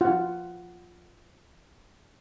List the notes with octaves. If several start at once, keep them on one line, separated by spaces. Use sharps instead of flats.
F4 F#5